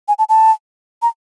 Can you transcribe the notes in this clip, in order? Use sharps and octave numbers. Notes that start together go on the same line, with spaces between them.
G#5
A5
A5
A#5